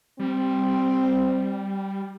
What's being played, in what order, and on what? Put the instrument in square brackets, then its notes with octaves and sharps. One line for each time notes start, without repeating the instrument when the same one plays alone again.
[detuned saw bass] G3 [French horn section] C4